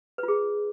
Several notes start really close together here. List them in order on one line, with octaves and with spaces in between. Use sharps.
B4 F4 G#4